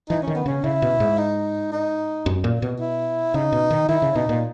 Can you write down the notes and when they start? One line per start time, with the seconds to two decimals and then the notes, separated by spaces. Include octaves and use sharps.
0.10 E3 D#4
0.23 D#3 C#4
0.35 B3
0.46 C#3 C#4
0.64 C#3 E4
0.82 B2
1.00 G#2
1.18 D#4
1.72 D#4
2.26 F#2
2.44 A#2
2.62 B2
2.80 E4
3.34 C#3 D#4
3.52 B2
3.70 D#3
3.88 D#3 E4
4.02 C#3
4.15 B2 D#4
4.29 A#2